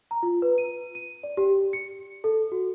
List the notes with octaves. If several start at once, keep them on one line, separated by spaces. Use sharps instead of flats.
A#5
F4
B4
D#7
D#7
D5
G4
C#7
A4
F#4